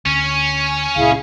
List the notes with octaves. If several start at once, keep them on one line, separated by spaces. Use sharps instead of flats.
D2 C#4
C#2 A#2 E4 G#4 F5